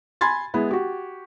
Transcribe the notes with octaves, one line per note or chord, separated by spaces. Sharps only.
G#5 B5 C6 G#6 A6
G#3 B3 E4
F#4 G4